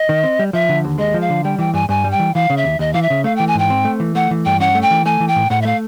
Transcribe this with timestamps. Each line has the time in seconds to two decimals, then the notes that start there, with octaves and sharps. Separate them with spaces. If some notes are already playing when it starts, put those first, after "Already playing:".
Already playing: D#5
0.09 D#3
0.24 C4
0.39 G3
0.53 F3 E5
0.69 D3
0.84 D#2
0.98 G#3 D#5
1.14 F3
1.21 F5
1.30 D3
1.44 G3 G5
1.59 E3 G5
1.74 G2 G#5
1.89 G2 G#5
2.04 G3
2.11 G5
2.19 E3
2.35 E3 F5
2.50 C#3
2.57 E5
2.64 D#2
2.79 D#2 D#5
2.93 E3 F5
3.03 E5
3.10 C#3
3.24 A3 F5
3.36 E3 G5
3.48 G#5
3.55 G#2 G5
3.70 C4
3.85 A3
4.00 E3
4.15 A3 F#5
4.31 E3
4.45 G2 G5
4.60 C#4 F#5
4.75 A3
4.82 G5
4.91 E3
5.05 A3 G#5
5.20 E3
5.28 G5
5.36 A2
5.50 A2 F#5
5.62 E5
5.65 A3 F5